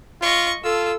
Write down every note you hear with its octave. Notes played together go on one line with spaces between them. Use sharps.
F4 D#5 C#6
F4 A4 E6